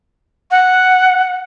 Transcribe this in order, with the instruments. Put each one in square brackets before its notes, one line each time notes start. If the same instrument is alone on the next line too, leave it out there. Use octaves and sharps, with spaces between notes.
[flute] F#5